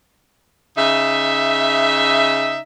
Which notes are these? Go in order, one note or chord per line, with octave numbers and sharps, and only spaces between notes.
C#3 D#4 E5